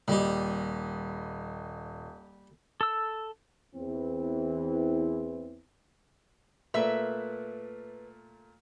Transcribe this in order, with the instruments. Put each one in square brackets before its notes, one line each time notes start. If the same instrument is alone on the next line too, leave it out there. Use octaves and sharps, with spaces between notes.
[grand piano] D#1 D#5 [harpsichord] G3 G4
[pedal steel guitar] A4 E6
[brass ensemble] E2 E3 C4
[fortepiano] A#2 A3 A#4 [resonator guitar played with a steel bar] B4 E5